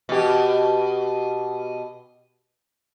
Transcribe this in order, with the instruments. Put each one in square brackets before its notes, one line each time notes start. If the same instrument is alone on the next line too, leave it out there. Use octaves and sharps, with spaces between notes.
[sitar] B2 G4